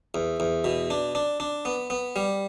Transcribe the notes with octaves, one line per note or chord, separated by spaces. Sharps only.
E2
E2
B2
D4
D4
D4
B3
B3
G3